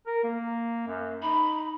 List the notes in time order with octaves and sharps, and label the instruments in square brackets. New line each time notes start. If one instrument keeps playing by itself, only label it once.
[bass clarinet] A#4
A#3
F#2
[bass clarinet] D#4 [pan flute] B5